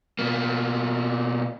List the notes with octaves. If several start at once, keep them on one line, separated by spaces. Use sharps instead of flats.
B2 A#3